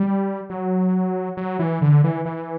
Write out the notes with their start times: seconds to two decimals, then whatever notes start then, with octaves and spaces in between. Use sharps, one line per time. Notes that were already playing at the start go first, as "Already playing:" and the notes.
Already playing: G3
0.50 F#3
1.37 F#3
1.59 E3
1.82 D3
2.04 E3
2.25 E3